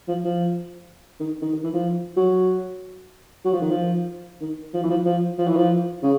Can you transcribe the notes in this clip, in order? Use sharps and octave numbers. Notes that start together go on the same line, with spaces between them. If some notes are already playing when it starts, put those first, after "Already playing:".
F3
F3
D#3
D#3
D#3
E3
F3
F#3
F#3
F3
D#3
F3
D#3
F3
E3
F3
F3
F3
E3
F3
C#3